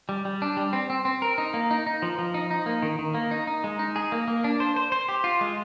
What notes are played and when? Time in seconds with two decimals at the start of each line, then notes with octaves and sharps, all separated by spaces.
0.09 G3
0.25 G3
0.42 D4
0.57 G3
0.73 C4
0.90 C4
1.05 C4
1.22 A#4
1.38 D#4
1.54 A#3
1.71 D#4
1.87 D#4
2.02 F3
2.18 F3
2.34 D#4
2.51 D#4
2.66 A#3
2.82 D#3
2.99 D#3
3.14 A#3
3.31 D#4
3.47 D#4
3.64 G#3
3.79 D#4
3.96 G#4
4.12 A#3
4.28 A#3
4.44 D4
4.60 C5
4.76 C5
4.92 C5
5.09 G4
5.24 F4
5.41 G#3